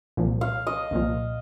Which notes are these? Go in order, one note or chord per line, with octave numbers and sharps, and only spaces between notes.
C2 A#2 F3
F5
D#5
C2 A#2 F3